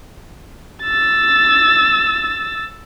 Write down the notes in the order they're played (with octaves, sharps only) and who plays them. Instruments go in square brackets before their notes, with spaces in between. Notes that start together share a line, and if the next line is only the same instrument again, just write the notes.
[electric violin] E6 A6